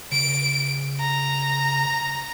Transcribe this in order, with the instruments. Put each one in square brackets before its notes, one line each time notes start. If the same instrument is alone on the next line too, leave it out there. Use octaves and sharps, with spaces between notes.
[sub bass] C#3 [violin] D7
[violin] A#5